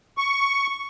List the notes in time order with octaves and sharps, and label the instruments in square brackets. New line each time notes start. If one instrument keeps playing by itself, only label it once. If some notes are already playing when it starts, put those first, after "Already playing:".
[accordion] C#6